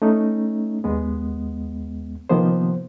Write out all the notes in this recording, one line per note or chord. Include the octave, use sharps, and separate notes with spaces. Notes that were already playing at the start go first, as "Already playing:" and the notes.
A3 C#4 D#4
D#2 G#3 B3
C3 D#3 F3 A#3 B3 C5